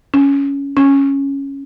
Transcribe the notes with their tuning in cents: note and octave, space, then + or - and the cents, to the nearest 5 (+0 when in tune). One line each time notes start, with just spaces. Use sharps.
C#4 +10
C#4 -5